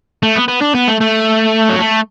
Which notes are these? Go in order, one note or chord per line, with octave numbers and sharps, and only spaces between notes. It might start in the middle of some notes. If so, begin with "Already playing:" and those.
A3
B3
B3
D4
B3
A3
A3
F#3
A3